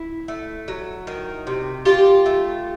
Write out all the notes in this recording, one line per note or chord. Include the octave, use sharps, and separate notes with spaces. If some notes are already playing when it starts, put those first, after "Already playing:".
Already playing: E4
A3
F#3
D#3
C3
D#3 F4 G4
A3